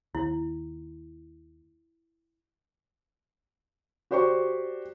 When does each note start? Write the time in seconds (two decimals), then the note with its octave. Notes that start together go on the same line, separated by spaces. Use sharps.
0.15 D#2 E4
4.11 F#4 G4 C5 D5 C#6